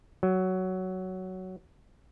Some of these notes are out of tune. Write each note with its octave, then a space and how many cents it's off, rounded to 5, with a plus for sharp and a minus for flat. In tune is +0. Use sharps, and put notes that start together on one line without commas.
F#3 +10